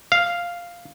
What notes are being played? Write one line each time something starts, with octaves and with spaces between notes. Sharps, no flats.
F5